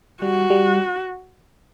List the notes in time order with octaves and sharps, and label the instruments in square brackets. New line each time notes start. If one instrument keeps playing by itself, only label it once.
[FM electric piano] G3 [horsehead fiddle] F#4
[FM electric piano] G3